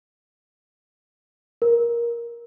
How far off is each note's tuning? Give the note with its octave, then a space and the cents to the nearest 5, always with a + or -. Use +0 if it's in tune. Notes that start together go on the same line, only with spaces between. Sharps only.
A#4 +15